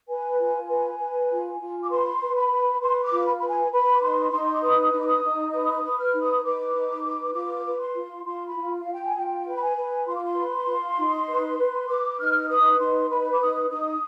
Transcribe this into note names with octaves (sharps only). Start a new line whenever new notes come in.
B4 G#5
F4
B4
B4
F4
F4
D6
B4 C6
B4
B5
B4
B4 C6
D6
F4
B5
B4 B5
G#5
B4 B5
D6
D#4 C6
D#4 C6
D6
B4 D#6
D#4
D6
D#6
D#4
B4 D#6
D#6
B4
F6
D#4
D#6
B4 D6
D#4
B4
F4 D6
B4
C6
F4
F4 C6
B5
F4
F4 F5
G5
G#5
F4 G5
B4
B5
G#5
B4
F4 C6
D6
C6
B4
F4
D#4
B4
B4
B4 D6
D#4 F6
B4 D#6
D#4 C6
B4 B5
D6
D#4 D#6
D#4 D#6